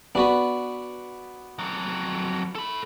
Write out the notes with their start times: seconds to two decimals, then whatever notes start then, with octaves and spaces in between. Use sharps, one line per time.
0.15 B3 D4 F#4 B4
1.59 F2 F#3
2.55 A4 B5